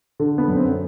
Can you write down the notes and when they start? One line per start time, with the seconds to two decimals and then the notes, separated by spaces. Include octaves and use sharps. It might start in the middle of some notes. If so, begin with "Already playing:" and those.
0.20 D3
0.38 B3
0.48 F#2
0.57 C4